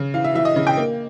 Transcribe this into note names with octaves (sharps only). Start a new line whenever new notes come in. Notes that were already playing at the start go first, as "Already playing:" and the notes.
Already playing: C#3
E3 F5
E5
E3 E5
D#5
C#3
G5
A#3